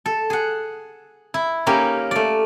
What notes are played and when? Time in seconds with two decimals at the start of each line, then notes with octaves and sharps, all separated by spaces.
0.06 A4
0.30 G#4 F#5
1.34 E4
1.67 A#3 C#4 D#4 G4 A#4
2.11 A3 D5